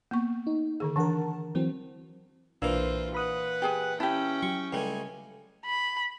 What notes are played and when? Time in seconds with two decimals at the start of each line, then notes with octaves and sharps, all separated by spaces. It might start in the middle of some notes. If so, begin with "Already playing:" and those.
0.11 A#3 B3 C#6
0.47 D#4
0.80 D3 D#3 G#4
0.96 E3 D4 A#4 F#5 A5
1.55 E3 F#3 C4 C5
2.62 B1 A#2 E3 D4 F4 C5 D6 E6
3.14 B4 F#5 B5 D#6
3.62 G4 G#4 G#5
4.00 C#4 E4 G4 G5 A5
4.43 F#3 C#6
4.73 C#2 G3 A3 G#5
5.66 B5